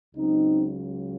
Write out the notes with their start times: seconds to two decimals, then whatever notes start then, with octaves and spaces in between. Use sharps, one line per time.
0.16 C#2 C#3 F#3 C4 D#4